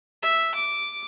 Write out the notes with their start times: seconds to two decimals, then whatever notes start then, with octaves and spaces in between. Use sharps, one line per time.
0.23 E5
0.55 D6